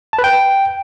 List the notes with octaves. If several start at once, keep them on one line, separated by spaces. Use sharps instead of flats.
A5
B4
G5